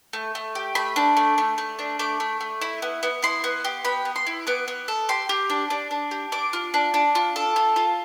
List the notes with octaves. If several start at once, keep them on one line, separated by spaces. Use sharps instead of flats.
A3
A3
G4
A3 B5
D4
A3
A3
A3
D4
A3 D6
A3
A3
E4
B3
B3
E4 C6
B3
G4
B3 B5
B3
C6
E4
B3 D6
B3
A4
G4 C6
G4
D4
D4
D4
G4
D4 D6
F4
D4
D4
F4
A4
F4
F4